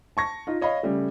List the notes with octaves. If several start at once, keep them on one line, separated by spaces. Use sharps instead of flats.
A5 C#6 A#6
D#4 F4
C#5 D#5 F5 B5
C#3 G3 A3